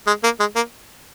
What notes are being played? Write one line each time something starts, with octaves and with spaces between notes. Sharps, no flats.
G#3
A#3
G#3
A#3